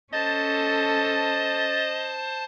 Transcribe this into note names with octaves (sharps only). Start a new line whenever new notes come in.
C#4 A4 C5 D#5 A5 A6